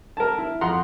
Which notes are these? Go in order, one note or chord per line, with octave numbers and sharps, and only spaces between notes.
A#4 A5
E4
F2 F#5 A#5 C6